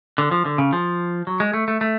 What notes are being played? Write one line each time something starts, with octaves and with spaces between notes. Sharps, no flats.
D3
F3
D3
C#3
F3
F#3
G#3
A3
A3
A3